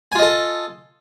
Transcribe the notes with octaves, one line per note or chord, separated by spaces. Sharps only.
F4 A4 D#5 G#5